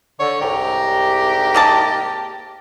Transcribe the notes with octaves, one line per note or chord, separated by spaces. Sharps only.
D3 C#5
C2 G#2 G4 A#5
A#3 D#5 A5